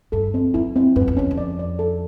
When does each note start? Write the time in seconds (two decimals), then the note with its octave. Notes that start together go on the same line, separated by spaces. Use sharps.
0.12 G2 A4
0.34 C4
0.54 F#2 E4
0.76 C4
0.96 F#2 B4
1.08 F2
1.17 E2 C#4
1.31 F2
1.38 D5
1.59 D5
1.79 A4